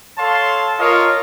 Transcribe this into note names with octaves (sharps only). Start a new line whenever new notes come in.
A4 C#5 F5 A5 C6
F4 A#4 C#5 D#5 F5